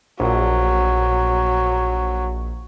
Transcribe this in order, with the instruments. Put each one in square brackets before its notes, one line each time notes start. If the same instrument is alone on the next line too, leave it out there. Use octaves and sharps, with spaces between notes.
[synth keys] A#1 [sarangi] F#3